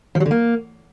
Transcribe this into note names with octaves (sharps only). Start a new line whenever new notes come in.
F3
F#3
D3
A#3